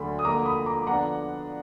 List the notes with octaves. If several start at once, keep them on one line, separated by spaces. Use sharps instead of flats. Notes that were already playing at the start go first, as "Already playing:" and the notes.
Already playing: D2 D3 F#3 B5
D#6
F2 D3 F3 A#3 A#5 D6
B5 D#6
A#5 D6
D3 F3 B3 D4 F#5 A#5